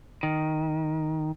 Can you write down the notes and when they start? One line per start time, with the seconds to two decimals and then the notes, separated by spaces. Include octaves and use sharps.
0.23 D#3